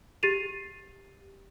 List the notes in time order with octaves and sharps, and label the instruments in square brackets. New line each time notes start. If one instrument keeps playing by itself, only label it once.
[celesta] G4 A6 C7 D#7 F7